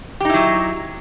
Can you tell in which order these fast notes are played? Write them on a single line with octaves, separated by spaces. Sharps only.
G4 D#4 E4 F#3